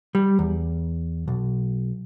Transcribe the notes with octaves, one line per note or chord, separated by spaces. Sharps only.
G3
E2
B1